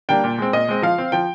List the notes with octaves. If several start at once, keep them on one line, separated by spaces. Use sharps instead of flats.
G3 A#3 D4 G5
A#2
G#3 C4
A#2 D#5
G#3 C4
F3 F5
C4
F3 G5